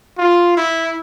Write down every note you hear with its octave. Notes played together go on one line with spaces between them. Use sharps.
F4
E4